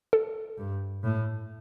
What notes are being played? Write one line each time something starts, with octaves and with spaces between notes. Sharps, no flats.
A4
G2
A2